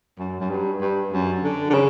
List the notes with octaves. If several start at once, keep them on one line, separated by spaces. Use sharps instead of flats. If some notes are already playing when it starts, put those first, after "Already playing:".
F#2
F#2
G2
G2
F#2
D3
D3
C#3